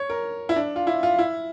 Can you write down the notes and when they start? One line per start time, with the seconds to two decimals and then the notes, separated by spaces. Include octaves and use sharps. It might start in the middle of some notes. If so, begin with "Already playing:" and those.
Already playing: C#5
0.10 A#4
0.49 E4
0.56 D4
0.76 F4
0.87 E4
1.03 F4
1.19 E4